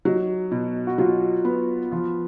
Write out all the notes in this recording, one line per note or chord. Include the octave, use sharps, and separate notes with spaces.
F#3 D#4
B2
F#4
F#3 F4
B3
F3 F4